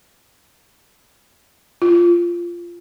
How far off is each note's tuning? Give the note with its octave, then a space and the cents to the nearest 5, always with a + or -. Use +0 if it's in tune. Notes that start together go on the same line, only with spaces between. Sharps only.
F4 -10